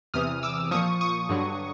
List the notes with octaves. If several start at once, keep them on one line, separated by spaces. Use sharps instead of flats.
E2 C3 E3 D#6 F6
D6 E6
A#2 F3 C#6 D#6
C#6 D#6
G2 D3 F#3